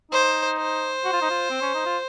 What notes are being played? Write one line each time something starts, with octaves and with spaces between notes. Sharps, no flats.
D#4 C5
C5
F#4
F4
D#4
F4
C4
C#4
D#4
F4